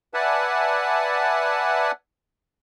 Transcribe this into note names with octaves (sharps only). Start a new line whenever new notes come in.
B4 D5 E5 F#5 G#5 A5